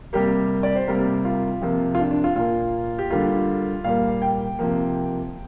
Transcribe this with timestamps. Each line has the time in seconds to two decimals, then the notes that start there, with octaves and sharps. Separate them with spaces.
0.13 C3 G3 A#3 G4
0.63 D5
0.76 C5
0.88 C3 G3 A#3 A#4
1.25 F4
1.62 C3 F3 A#3
1.95 F4
1.99 D4
2.11 D4
2.24 F4
2.36 A#2 A#3 F4
2.98 G4
3.10 D3 G3 A#3 F4
3.84 A#2 G3 A#3 F5
4.22 G5
4.59 C3 F3 A#3